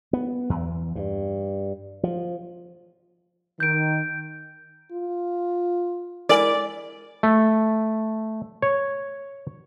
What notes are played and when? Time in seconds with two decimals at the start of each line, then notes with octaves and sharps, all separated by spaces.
0.13 B3
0.50 E2
0.95 G2
2.03 F3
3.60 D#3 G6 D7
4.92 F4
6.29 G#3 E4 A#4 D5 G#5
7.23 A3
8.62 C#5